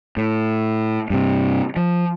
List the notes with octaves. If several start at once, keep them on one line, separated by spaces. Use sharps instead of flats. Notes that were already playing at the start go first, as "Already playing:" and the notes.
A2
G2 C3
F3